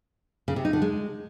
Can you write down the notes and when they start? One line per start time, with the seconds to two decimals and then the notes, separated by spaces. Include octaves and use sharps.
0.48 C#3
0.56 C3
0.65 D#4
0.73 D3
0.82 G#3